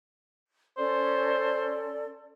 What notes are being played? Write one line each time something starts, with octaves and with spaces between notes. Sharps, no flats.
C#4 A4 C5 D5